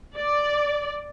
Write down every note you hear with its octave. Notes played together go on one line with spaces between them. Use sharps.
D5